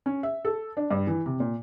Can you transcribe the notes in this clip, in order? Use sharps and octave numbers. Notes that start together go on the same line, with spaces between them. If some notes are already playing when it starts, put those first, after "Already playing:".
C#4
E5
A4
D4
G2
E3
C3
A#2